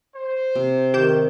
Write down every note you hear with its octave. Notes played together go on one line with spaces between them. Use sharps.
C5
C3
D#3 G4 G6 E7